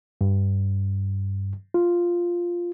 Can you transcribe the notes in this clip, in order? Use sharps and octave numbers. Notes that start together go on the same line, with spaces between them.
G2
F4